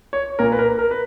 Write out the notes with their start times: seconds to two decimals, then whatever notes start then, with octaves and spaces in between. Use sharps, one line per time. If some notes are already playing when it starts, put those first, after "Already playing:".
0.13 C#5
0.39 A#2 A#4
0.52 B4
0.59 A#4
0.79 A#4
0.91 B4